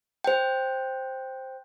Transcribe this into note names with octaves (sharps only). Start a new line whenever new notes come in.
C5 G5